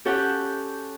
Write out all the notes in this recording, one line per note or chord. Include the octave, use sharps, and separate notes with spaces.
C#4 G4 A4 C#5 F#5 G5